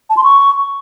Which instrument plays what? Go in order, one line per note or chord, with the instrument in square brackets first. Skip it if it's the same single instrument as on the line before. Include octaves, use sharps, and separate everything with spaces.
[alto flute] A5
C6
C#6